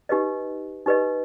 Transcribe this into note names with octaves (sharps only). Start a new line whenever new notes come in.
D#4 G4 B4 D#5
D#4 G4 B4 D#5